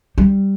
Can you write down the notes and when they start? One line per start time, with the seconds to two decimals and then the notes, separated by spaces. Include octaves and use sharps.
0.18 G3